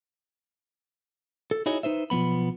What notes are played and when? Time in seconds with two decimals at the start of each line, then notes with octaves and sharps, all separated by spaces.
1.51 A4
1.66 D#4 E4 F#4 G#4 C#5 D#5
1.83 D#4 B4 C5 E5
2.10 B1 F3 F#3 B3 B5